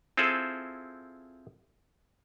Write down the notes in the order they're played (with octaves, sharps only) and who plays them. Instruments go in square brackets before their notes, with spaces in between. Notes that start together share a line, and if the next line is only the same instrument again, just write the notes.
[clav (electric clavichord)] C4 E4 F4 G#4 A4 C5